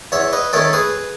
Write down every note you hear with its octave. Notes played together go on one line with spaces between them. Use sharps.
E2 C#5 E5
B4 D#5
D#3 A3 C#4 A4 C#5
G#4 B4